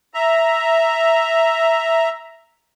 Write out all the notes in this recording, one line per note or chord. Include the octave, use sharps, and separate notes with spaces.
E5 A#5